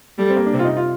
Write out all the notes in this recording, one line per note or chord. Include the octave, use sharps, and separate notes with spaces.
G3 A3
C4
A#3
D4
C3 C4
F4
D#4
F4